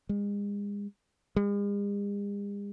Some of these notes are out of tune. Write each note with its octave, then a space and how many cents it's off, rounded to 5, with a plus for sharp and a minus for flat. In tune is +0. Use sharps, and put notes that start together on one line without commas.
G#3 -35
G#3 -45